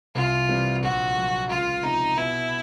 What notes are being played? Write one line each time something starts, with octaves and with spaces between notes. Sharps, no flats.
C2 F4
C3 E3 G3
A#1 F#4
A#2 F#3
C#2 F4
C3 F3 D#4
B2 E4